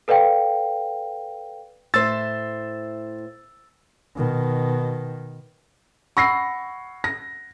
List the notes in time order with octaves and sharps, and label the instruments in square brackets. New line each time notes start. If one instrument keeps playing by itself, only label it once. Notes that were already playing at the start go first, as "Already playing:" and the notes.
[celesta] A4 B4 D5 F5 G5
[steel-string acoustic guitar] A2 C5 E5 [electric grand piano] E6 A6
[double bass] B2 D#3
[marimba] F#5 B5 E6 [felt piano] C#6 A#6 C7
[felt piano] A#6